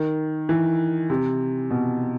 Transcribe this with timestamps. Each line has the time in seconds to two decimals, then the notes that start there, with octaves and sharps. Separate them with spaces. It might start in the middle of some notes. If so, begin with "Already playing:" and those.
Already playing: D#3
0.49 E3
1.10 C3
1.70 B2